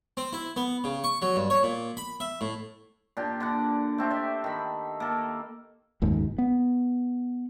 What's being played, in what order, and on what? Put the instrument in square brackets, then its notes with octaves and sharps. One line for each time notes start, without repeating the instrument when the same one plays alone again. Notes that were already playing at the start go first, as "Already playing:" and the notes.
[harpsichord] C4
E4
B3
C#3
C#6
F#3
G2
C#5
A#2
B5
E5
A2
[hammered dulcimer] A#2 D4 G4
D3 D5 F#5
A3 C4 G4
D5 E5
D#3 B5
A#3 A4
[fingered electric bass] F#1 D#2 G#2 G#3
B3